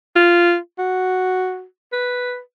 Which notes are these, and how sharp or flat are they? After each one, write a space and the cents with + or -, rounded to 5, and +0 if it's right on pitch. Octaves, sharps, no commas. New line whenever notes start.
F4 -10
F#4 +0
B4 +0